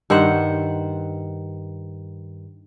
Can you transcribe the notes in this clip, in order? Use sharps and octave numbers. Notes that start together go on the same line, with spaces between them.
G2 D#3 C5 F#5